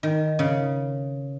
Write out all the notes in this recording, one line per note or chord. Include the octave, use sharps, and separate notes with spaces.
D#3
C#3